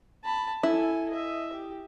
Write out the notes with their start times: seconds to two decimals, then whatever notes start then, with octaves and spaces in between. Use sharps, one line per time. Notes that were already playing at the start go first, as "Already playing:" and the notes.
0.24 A5 B5
0.63 E4 A4 G#5
1.10 D#5 E5
1.53 G4